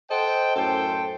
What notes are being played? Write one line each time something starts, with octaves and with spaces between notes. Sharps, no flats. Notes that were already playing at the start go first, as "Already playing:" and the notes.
A4 C5 D#5 F#5 G5
F#2 A2 A4 C5 G5